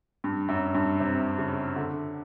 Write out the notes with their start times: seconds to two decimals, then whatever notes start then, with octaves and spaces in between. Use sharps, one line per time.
0.24 G2
0.49 F#2
0.74 G2
1.00 C3
1.39 C#3
1.76 D3